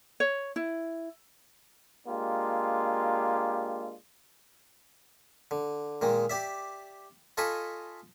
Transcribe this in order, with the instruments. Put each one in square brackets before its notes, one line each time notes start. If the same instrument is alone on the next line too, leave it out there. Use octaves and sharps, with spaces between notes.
[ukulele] C#5
E4
[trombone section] G#3 A#3 D4 F4 G4
[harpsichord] D3
A#2 D#3 G#3
G4 D5 E5
F4 A4 D#5 G#5 B5 C#6